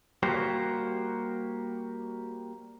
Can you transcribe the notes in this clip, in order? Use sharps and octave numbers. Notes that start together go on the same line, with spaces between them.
G3 A#3 F#4 G4 C5